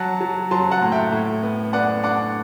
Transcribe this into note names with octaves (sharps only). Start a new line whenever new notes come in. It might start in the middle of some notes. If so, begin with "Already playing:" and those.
Already playing: F#3 F#5 A5
F#3
F#3 A5 C6
F#5 A5
A2
E5 G5
A2
B3
B3 D5 F#5
D4 D5 F#5